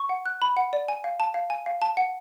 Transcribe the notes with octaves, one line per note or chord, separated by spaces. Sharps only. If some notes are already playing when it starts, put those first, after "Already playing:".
Already playing: C#6
F#5
F#6
B5
F#5
D5
G#5
F5
A5
F5
G#5
F5
A5
F#5